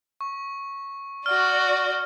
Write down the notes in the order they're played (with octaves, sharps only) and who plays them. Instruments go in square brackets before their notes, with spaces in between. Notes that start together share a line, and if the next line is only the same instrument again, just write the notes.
[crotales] C#6
[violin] F#4 D5 [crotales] F6